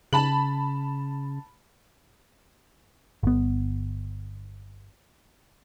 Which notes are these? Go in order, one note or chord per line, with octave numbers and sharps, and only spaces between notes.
C#3 A5 B5 F#7
G1 B3